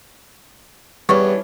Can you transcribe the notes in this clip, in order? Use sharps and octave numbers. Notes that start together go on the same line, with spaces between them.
E2 E3 G3 C#4 D4 C#6